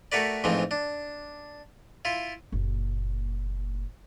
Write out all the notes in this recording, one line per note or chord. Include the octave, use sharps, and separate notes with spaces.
A3 F#4 A#4 B4 D5
A1 G#2 E3 F3 C4
D4
E4 F4
F#1 A#2